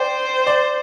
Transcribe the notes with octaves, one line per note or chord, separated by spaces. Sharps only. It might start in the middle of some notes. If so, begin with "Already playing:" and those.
Already playing: C5 D5 G5
D5